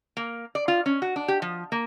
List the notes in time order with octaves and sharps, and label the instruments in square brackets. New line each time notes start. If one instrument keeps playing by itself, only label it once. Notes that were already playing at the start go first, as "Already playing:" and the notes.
[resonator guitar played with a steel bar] A#3
D5
F4
C#4
F#4
D4
G4
F3
A#3